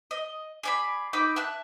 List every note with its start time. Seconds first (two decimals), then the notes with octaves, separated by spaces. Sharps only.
0.11 D#5
0.63 G#4 D5 B5
1.13 D#4 B4 D6 E6
1.36 E5 A5 F#6